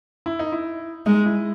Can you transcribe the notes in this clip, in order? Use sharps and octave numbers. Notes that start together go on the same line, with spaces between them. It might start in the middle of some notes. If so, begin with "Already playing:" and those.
E4
D#4
E4
G#3 D#4
E4